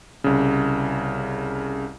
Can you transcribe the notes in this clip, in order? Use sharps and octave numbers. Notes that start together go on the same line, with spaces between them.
C2 C#3